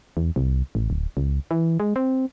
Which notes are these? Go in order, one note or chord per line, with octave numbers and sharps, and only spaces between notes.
E2
C2
A1
D1
C#2
E3
G#3
C4